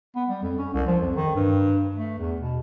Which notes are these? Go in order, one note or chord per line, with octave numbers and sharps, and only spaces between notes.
B3
G3
F2
C#4
C2
F3
F2
D#3
G2
A3
E2
B2